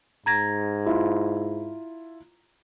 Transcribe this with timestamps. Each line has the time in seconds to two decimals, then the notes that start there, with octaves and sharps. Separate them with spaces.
0.26 G#2 A#5 G#6 A#6
0.86 E4 F4